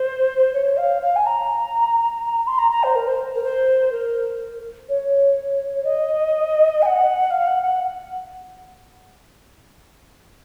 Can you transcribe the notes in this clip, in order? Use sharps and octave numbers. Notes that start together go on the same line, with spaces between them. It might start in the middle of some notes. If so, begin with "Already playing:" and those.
Already playing: C5
C#5
F5
F5
G#5
A#5
C6
A#5
A#5
C5
A#4
C5
A#4
C5
A#4
C#5
D#5
G#5
F#5
F5
F#5
F#5